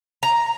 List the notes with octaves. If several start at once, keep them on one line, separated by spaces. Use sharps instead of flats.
A#5